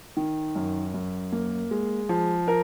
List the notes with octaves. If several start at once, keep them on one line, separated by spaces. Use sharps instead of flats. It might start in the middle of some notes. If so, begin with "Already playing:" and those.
D#3
F#2
F#2
A#3
G#3
F3
A#4